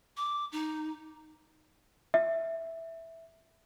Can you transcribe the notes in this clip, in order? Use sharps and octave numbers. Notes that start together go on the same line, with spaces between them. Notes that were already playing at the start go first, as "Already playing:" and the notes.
D6
D#4
E5